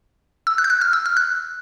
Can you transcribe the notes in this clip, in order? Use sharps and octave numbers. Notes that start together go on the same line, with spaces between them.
E6
F#6
G6
F#6
F6
E6
F6
F#6